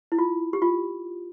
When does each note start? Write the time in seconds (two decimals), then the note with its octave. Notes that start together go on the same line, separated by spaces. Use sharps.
0.12 E4
0.18 F4
0.53 G4
0.62 F4